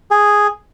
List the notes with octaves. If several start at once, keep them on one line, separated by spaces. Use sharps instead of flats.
G#4